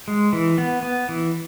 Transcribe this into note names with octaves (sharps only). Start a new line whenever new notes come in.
G#3
E3
B3
B3
E3